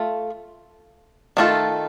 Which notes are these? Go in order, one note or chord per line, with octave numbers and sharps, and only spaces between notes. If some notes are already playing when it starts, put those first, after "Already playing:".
Already playing: A3 F4
D#3 A3 D4 F4 A4